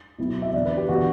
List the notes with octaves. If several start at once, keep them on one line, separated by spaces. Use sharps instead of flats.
B2 F#3 C4 E4
E5
E3 B3 D4 D5
B4
G4
E3 B3 D4 F#4